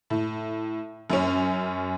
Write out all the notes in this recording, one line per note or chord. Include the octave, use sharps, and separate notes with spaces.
A2
F#2 C#4